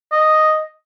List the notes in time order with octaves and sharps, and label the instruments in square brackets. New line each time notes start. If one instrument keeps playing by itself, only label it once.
[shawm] D#5